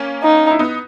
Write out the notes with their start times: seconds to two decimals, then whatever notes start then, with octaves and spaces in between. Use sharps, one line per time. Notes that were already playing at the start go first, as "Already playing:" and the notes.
Already playing: A#3 C#4
0.23 D#4
0.51 E4
0.59 B3 D#4